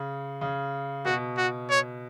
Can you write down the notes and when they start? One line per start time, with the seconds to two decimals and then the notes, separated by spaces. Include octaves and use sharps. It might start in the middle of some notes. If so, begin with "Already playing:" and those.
Already playing: C#3
0.41 C#3
1.05 B2 F#4
1.38 F#4
1.70 C#5